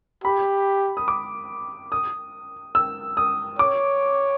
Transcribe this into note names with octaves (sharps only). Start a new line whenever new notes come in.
G4 B5
D#6
D6
D#6
E6
D#6
C#5 D6